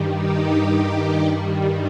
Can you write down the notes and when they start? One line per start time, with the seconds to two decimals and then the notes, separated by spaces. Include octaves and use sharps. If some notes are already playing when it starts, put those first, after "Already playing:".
Already playing: G2 D#3 G3
0.13 D#4 G4